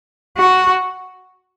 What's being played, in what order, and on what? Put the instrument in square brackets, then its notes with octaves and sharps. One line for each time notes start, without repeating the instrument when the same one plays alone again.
[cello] F#4